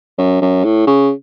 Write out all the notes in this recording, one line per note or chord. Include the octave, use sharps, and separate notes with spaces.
F#2
F#2
A2
C#3